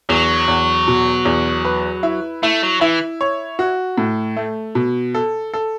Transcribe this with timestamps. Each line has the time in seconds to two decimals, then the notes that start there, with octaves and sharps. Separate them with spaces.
0.09 E2 F#3
0.48 E2
0.88 B2
1.25 E2
1.65 B4
2.03 E4
2.43 A3 E4
2.63 F#3
2.81 E3 E4
3.21 C#5
3.59 F#4
3.98 A2
4.37 A3
4.75 B2
5.15 A4
5.54 A4